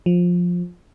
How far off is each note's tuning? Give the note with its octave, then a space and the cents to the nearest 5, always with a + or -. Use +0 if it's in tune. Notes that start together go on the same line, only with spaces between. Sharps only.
F3 +15